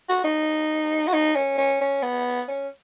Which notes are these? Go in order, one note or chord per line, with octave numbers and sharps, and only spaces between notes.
F#4
D#4
F#4
D#4
C#4
C#4
C#4
B3
C#4